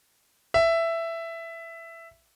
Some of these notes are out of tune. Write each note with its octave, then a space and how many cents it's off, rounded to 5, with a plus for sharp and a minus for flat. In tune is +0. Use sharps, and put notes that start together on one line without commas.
E5 +10